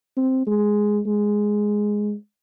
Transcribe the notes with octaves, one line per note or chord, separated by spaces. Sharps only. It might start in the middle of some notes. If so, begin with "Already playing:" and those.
C4
G#3
G#3